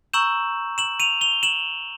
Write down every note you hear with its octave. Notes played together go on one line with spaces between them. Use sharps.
A#5 C#6 E6 G6 E7 F#7
E7 F#7
D#7 F7
F7 G7
E7 F#7